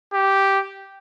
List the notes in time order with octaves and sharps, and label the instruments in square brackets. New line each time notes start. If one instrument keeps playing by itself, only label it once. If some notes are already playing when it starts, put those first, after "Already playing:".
[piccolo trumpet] G4